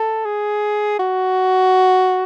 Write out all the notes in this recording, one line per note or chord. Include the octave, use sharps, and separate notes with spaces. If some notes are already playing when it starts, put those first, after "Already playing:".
Already playing: A4
G#4
F#4